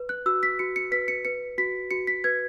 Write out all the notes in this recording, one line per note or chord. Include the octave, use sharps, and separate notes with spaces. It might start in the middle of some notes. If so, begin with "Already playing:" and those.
Already playing: B4
F#6
F#4 E6
B6
F#4 C#7
C#7
B4 B6
C#7
B4 C#7
F#4 B6
F#4 C#7
B6
B4 G#6